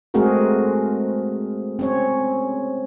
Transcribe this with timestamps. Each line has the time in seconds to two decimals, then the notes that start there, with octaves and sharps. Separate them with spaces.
0.14 G#3 A3 C4 F#4 G#4 A#4
1.79 C4 C#4 C#5